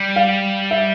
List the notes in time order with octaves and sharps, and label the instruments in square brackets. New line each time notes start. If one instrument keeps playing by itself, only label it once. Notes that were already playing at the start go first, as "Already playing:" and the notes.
Already playing: [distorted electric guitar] G3
[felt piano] F5
E5